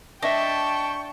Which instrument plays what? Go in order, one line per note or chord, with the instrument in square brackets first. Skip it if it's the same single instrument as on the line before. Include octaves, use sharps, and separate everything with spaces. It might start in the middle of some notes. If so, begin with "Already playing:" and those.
[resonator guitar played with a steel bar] D4 [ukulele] D#5 E5 [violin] G5 A5 [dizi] C#6